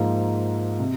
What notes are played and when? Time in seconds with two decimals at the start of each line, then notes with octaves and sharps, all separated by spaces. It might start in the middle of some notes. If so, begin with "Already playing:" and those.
Already playing: G#2 F3 A#3
0.79 C3